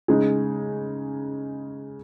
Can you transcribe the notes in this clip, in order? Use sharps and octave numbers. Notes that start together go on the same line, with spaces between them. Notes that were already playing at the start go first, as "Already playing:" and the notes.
C#3 G#3 D#4 G#4